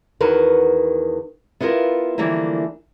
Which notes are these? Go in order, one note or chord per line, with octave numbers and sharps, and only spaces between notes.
E2 D#3 F#4 A#4 B4
B3 E4 F4 G4 A#4
D3 E3 F3 G3 A3 A#3